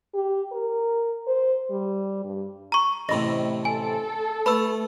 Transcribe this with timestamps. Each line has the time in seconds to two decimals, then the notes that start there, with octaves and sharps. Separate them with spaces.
0.14 G4
0.52 A#4
1.27 C5
1.70 G3
2.24 G2
2.72 A#5 C#6
3.09 A1 A2 C3 D#5 B5 A#6
3.65 A4 G#5
4.46 A3 B4 B5 E6